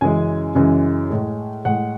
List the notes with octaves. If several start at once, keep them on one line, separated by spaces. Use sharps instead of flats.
F#2 C#3 E3 G#3 G#5
F#2 C#3 E3 G#3
A2 G#3
A2 G#3 F#5